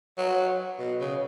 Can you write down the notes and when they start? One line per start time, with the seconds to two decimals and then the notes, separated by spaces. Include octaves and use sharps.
0.18 F#3
0.79 B2
1.00 C#3